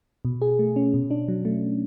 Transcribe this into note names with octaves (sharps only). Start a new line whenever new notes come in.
B2
G#4
A3
C#4
B2
D4
F#3
A3